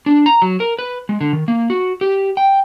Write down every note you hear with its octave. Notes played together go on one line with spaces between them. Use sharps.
D4
A#5
F#3
A#4
B4
G#3
D3
D#3
A#3
F#4
G4
G5